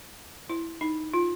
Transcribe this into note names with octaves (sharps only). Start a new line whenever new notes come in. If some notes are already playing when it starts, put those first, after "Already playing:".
E4
D#4
F4